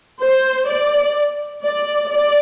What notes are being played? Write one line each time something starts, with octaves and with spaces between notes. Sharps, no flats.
C5
D5
D5
D5